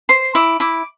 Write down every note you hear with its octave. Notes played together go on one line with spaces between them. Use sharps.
C5 C6
E4 D6
E4 D6